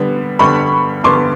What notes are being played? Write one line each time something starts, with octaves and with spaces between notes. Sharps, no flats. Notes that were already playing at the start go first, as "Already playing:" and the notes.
Already playing: D3 G3 B3
G2 D3 G3 B3 B5 C#6
G2 D3 G3 B3 C6 D6